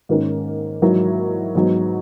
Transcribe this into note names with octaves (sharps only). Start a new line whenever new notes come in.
G#2 D#3 A#3 C#4
G#2 F#3 A#3 E4
G#2 F#3 B3